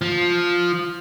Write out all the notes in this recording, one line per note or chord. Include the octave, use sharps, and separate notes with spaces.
F3